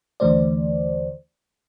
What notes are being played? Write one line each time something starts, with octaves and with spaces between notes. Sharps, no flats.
D#2 D3 E3 A3 C5 D5